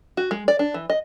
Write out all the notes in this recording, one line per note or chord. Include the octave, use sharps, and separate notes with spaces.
F#4
G#3
D5
D4
E3
D#5